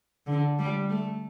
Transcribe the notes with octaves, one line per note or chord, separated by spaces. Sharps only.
D3
G3
A3